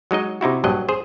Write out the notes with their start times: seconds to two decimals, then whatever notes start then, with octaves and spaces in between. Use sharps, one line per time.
0.11 F#3 G#3 D#4 D#5
0.41 C3 D#4 E4 F#4
0.64 A#1 G2 F#3 D#5
0.89 G#4 C5